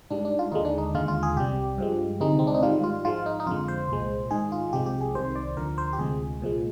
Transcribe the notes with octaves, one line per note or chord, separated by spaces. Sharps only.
G#2 G3 D4
D4
F4
D#2 D3 G#3 D#4
D4
D#4
D#2 D3 G#3 F4
F4
G#4
C2 C3 G3 G4
G2 F3 G#3
D2 C3 D#3 G#3 D#4
C4
D4
D#4
G#2 D#3 G3 F4
F4
G#2 F3 G#3 F4
D#4
D#4
F2 D3 G#3 F4
C5
C2 A#2 G#3
G#2 D#3 G#3 G#4
F4
C2 C3 F3 G#3 G4
G4
G#4
C2 C3 D#3 C5
D5
D2 D3 F3 A#4
C5
G4
D2 C3 F3 G#3 G#4
C2 A#2 F3 G#3